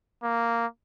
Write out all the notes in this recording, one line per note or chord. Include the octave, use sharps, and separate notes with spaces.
A#3